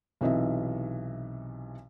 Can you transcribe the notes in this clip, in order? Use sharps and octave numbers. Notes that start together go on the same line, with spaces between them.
B1 C3 E3 D#4 D#5 E5